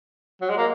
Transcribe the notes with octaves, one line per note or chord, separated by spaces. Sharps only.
F#3
G#3
A#3